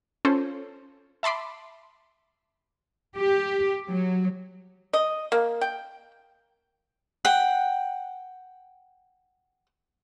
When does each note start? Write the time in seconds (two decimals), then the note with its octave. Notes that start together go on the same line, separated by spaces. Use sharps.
0.25 C#4 F4 A4 C5
1.23 E5 A5 B5 C6 D6
3.17 G4
3.90 F#3
4.93 D#5
5.32 A#3
5.61 G5
7.25 F#5 G5